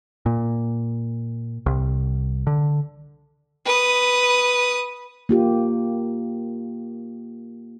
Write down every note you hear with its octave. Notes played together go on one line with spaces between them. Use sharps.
A#2
C2
D3
B4 D#6
A#3 F4 G4